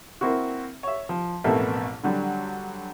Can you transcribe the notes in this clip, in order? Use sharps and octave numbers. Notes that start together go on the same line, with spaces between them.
A#3 C4 E4 F#4
C#5 E5
F3
A1 F2 B2 A3 A#3 E5
D3 F#3 G3